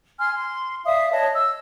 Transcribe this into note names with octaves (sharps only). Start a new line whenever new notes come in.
G#5 C6 F6
C6
D5 E5 F5 D#6
B4 C#5 D#5 A5
E6